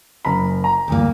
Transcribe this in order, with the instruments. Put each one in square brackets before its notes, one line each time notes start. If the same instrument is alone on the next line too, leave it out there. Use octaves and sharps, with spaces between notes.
[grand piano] F#1 A#5 B5
A#5
[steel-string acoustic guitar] D2 G2 A#3